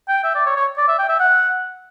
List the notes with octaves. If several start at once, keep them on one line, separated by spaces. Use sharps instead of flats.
G5
E5
D5
C#5
C#5
D5
E5
G5
E5
F#5